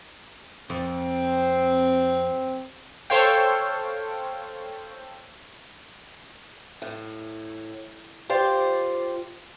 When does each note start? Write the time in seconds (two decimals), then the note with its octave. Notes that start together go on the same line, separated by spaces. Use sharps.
0.70 F2 C4
3.10 A4 C5 C#5 F5 G5
6.82 A2
8.30 F4 G4 C5 D5